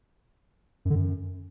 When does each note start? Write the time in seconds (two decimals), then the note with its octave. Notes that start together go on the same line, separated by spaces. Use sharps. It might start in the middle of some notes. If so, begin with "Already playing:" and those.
0.85 F#2
0.90 D3
0.95 F#2